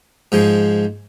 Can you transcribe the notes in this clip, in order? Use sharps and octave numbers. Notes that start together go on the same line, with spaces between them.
G#2 F3 G#3